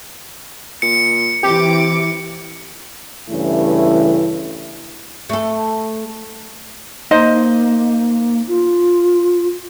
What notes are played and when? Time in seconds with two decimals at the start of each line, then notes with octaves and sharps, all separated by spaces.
0.82 A#2 C#7
1.43 C3 E3 G4 D6
3.30 G2 C#3 E3 A3 C#4 E4
5.29 A3 A4
7.11 A#3 D#4 C5 D#5
8.48 F4